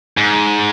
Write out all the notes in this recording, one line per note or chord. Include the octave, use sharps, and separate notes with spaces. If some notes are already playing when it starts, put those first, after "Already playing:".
G#2